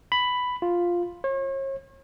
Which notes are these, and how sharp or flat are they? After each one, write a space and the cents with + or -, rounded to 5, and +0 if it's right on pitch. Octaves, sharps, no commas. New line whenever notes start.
B5 +5
F4 +0
C#5 -40